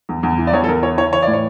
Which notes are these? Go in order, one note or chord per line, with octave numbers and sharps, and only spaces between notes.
E2
E2
E3
D5
E2 C#5
A4
E2 A#4
E3 C#5
E3 C#5
E3 C#5
A2 D5
C#5